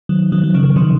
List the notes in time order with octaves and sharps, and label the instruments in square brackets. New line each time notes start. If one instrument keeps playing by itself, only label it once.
[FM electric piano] D#3 F#3
D#3 F#3
F#3
C#3 F3
C3 D#3